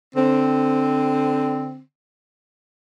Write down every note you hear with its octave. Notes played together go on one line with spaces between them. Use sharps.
D3 C4